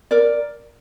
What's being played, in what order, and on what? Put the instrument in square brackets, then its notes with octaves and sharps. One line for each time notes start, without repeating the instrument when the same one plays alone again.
[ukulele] A#4 D5